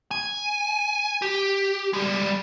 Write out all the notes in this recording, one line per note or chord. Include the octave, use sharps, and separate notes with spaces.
G#5
G4
G3 G#3